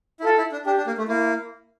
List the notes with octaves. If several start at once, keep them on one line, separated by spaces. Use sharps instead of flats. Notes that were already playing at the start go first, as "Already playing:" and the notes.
E4
F4 A4
E4
D4
D4 G4
D4
A#3
A3
A#3 E4